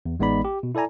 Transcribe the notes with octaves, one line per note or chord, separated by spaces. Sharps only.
E2
A1 G#3 B3 D#4 D5 B5
G4
B2
E4 A4 D5 G#5 A#5